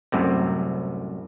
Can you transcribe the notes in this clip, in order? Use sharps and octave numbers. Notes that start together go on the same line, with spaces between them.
C2 F#2 A2 C3